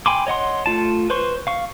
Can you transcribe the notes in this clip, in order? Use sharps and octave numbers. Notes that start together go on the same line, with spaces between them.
G5 G#5 B5 C6 D6
C#5 D#5 F#5 C6
A3 F4 A5
B4 C5 C6 C#6
F5 C#6